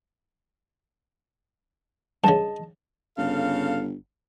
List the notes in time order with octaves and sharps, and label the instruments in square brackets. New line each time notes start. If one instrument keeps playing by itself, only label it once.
[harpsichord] G2 C#3 [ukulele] D#5 A5
[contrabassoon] G1 [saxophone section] C#3 A4 F5